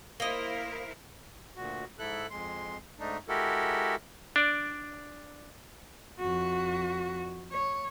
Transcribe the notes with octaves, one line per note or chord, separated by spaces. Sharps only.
A#3 E4 A#4 C5 D#5
D2 A#2 F#4
G#2 E4 A4 F#6
F2 G#3 C6
G#2 A3 D4 D#4
G#3 E4 F#4 G4 A4 A#4
D4 D5
F2 F#4
C#5